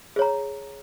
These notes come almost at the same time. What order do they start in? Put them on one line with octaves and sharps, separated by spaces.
G#4 C#5 A#5